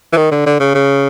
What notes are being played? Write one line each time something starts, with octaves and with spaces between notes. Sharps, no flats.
E3
D#3
D3
D3
C#3
C#3